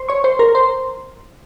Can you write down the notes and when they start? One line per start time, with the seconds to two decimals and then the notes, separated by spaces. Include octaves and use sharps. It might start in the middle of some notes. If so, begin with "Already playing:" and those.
Already playing: C5 C6
0.09 C#5 C#6
0.24 C5 C6
0.39 A#4 A#5
0.55 C5 C6